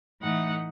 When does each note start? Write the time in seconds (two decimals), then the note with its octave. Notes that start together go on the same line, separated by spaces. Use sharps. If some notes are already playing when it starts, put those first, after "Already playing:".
0.21 A2 E3 A3 D#4 F#5